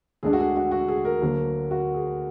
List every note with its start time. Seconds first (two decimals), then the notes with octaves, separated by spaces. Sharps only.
0.23 D2 D3 G#3 D4 G#4
0.33 F#4
0.40 G#4
0.56 F#4
0.71 F#4
0.88 G#4
1.05 A#4
1.21 D2 D3 F#3 A#3
1.71 F#4
1.94 G#4